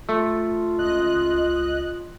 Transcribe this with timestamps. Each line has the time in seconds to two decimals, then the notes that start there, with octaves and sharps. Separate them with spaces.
0.09 A3 F4
0.78 C#2 D#5 F#6